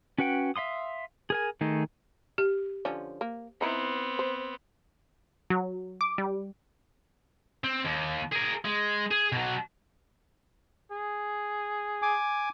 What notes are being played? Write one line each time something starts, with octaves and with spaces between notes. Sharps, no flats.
C#4 F#4 B4 F#5 G5
E5 F5 C6 D#6
G#4 A#4 G#5
D#3 A3 D#4 G#4
G4
D3 F3 C#4
A#3
E3 B3 C4 D#4 E4
C5
F#3
D6
G3
C4
D#2
G#4 A#4
G#3
G#4
B2 F#3
G#4
G#5 D6